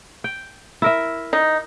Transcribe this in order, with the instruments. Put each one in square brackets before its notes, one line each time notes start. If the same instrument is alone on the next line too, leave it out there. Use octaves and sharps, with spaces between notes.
[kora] G5
E4 A#4 E5
[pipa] D#4